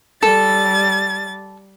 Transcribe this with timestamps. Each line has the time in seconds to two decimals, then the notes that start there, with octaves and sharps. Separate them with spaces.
0.23 G3 A4 A6